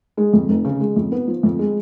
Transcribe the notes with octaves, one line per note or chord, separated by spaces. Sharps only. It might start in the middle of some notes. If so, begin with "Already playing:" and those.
G#3
F2
F1
C#3
G#3
F2
B3
F3
F2
G#3